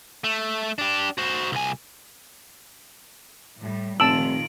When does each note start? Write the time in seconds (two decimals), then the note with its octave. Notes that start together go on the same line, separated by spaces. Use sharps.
0.24 A3
0.78 D4 G4
1.18 F#4 C5
1.52 C2 G#5
3.59 A2 G3
4.00 F1 A#2 D#3 F4 A5 E6 D7 F#7